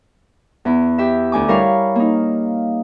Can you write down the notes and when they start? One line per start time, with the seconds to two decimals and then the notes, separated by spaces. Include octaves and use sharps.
0.65 E2 E4
0.98 G4 E5
1.32 D2 G#5 D6
1.48 G3 E4 A#4 C#5 F5
1.96 A#3 D#4